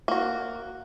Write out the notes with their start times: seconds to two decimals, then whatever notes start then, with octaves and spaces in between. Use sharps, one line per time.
0.08 A#3 F#4